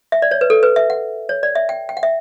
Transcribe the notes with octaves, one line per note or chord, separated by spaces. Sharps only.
E5
D5
C#5
B4
A4
B4
E5
F#5
C#5
D5
E5
G5
G5
F#5
E5